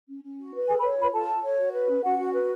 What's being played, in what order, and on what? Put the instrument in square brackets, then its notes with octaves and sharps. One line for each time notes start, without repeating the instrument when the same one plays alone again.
[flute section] C#4
C#4
F#4
B4
G#4 A4 G#5
B4 B5
C#5
F4 B4 B5
F4 A4 A5
A4
C#5
F#4
B4
C#4
C#4 F#4 F#5
F#4
B4